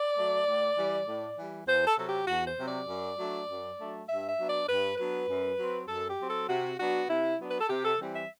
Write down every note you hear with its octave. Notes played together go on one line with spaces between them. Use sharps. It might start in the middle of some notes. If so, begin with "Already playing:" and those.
Already playing: D5
F#3 A3
A2
E3 G3
A2
E3 G3
E2 C5
A4
C3 F#3 C4 A4
G4
E2 F#4
C5
C3 F#3 C4
D5
F#2
F#3 A3 D4
F#2
F#3 A3 D4
G2 E5
E5
F#3 B3 D4
D5
G2 B4
F#3 B3 D4 B4
F#2
F#3 C4
F#2 A4
G4
F#3 C4
A4
C3 F#4
F#3 B3 D4 F#4
C3 E4
F#3 B3 D4
B4
A4
C3 G4
A4
E3 G3 C4
E5